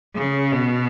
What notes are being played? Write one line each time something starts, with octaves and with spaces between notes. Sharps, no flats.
C#3
B2